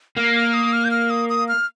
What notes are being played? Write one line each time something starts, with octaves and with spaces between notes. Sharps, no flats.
A#3 F6
F6
D#6
F6
G6
F6
D#6
D#6
F6